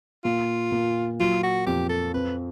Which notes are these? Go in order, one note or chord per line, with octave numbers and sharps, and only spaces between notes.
A#2 F4
A#2
F#3 F4
F#4
F2 G4
A4
C4 B4